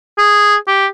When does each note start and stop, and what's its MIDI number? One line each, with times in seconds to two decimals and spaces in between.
0.18 0.56 68
0.68 0.87 67